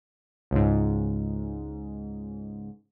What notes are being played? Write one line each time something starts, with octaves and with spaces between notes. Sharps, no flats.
C#2 G#2